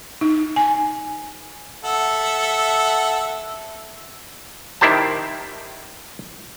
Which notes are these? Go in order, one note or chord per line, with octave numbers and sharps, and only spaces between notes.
D#4
G#5
A4 E5 F#5
D#3 E4 G4 C5 A5